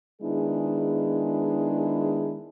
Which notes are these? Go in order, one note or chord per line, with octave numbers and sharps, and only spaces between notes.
D#3 G#3 B3 D4 E4 G#4